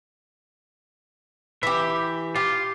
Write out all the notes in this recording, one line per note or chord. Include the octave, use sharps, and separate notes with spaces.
E3 G4 E5
F4 G4